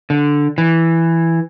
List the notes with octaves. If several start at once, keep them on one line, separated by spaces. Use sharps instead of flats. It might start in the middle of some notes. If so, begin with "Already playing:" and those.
D3
E3